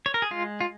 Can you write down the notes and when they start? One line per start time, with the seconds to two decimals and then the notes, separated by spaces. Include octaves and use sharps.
0.06 C#5
0.14 A#4
0.22 G#4
0.31 G#3 F4
0.61 F4